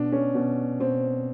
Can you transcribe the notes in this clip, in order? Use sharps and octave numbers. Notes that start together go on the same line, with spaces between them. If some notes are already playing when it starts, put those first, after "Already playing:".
Already playing: B2 D4
C#4
B2
B2 C4